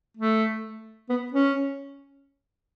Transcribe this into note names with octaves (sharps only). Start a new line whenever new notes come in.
A3
B3
C#4